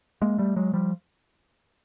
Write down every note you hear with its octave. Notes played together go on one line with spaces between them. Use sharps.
G#3 A#3
G3 A3
F#3 G#3
F3 G3